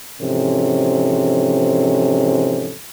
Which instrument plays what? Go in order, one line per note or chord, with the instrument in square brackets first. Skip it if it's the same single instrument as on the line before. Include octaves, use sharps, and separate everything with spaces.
[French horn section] G#2 C3 E3 F3 C#4 A4